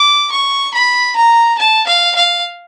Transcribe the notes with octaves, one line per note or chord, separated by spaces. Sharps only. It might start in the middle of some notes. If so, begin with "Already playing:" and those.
Already playing: D6
C#6
B5
A#5
A5
F5
F5